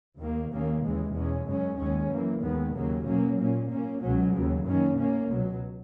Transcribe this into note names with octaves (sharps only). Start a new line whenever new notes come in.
D#2 D#3 A#3
D#2 D#3 A#3 C#4
D#2 C#3 E3 G#3
E2 B2 G#3 C#4
F#2 C#3 G#3 C#4
D#2 D#3 G#3 C#4
F#2 E3 A#3
D#2 D#3 G#3 B3
D#2 C#3 F#3 A#3
B2 F#3 A#3 C#4
A#2 A#3 C#4
A#2 A#3 C#4
C#2 B2 F#3 C#4
D#2 C#3 F#3
F#2 D#3 A#3 C#4
B2 A#3 C#4
C#2 B2 F#3